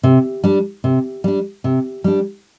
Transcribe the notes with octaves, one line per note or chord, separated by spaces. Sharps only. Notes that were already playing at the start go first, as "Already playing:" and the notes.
C3
G3 D4
C3
G3 D4
C3
G3 D4